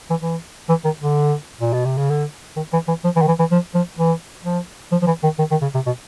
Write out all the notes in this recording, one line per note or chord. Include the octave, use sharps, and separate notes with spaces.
E3
E3
E3
D#3
D3
A#2
B2
C3
C#3
D3
D#3
E3
E3
F3
E3
D#3
E3
E3
F3
F3
E3
F3
F3
F3
E3
D#3
D#3
D#3
C#3
C3
B2